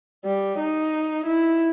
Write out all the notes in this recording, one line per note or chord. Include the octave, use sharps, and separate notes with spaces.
G3
D#4
E4